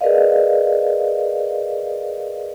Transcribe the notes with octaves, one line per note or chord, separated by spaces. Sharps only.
G#4 A#4 B4 D5 D#5 F5